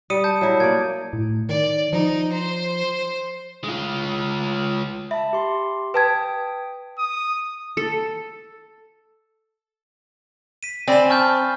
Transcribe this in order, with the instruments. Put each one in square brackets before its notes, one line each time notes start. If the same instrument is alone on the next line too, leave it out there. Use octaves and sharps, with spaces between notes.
[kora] G3 [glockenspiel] D#6 C#7 D#7
[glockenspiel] A5 G6
[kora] F#3 E4
[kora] A#3 D5 [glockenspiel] G#6
[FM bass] A2
[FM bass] D#3 [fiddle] D5
[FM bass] F3 [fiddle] D#4
[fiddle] C5
[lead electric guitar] G#3 F4
[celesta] E5 [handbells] A5 B5
[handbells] G4 C6
[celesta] B4 A5 G#6 [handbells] G5 D#6 B6
[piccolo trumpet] D#6
[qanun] A4
[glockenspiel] B6 D#7
[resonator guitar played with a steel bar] C4 [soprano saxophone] D5 [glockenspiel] G#5 B5 E7
[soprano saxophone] A5 [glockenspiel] C#6 F6 G6